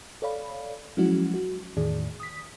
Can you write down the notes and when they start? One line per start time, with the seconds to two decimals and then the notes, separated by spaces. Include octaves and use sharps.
0.22 A4 C#5 D5 F5 B5
0.97 F3 F#3 G#3 C#4 E4 F#4
1.34 F#4
1.77 E2 A2 D#3 G#4 D5
2.20 D#6 B6